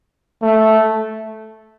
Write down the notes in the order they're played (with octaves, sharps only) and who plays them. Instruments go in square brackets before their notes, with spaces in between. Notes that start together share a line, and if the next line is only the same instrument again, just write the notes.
[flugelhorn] A3